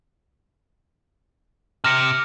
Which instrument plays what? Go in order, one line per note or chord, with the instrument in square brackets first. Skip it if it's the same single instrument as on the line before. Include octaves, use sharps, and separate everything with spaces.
[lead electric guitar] C3 [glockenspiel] F6 A#6 C#7